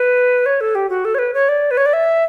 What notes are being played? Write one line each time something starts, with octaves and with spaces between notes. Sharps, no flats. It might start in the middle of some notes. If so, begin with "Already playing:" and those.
Already playing: B4
C#5
A4
G4
F#4
A4
C#5
B4
C#5
D5
B4
C#5
D5
E5